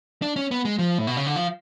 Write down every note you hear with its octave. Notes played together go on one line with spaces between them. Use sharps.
D4
C#4
B3
G#3
F3
A2
B2
C#3
D3
F3